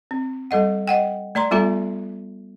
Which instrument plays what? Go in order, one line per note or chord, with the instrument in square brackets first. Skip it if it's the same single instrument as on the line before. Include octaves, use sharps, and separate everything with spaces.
[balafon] C4
G3 A4 D#5 F#5
D#5 F#5 G5
A3 D5 A#5 C6
G3 B3 F4 A4 E5 A#5